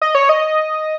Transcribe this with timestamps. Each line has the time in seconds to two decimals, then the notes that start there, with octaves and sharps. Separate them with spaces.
0.02 D#5
0.15 C#5
0.29 D#5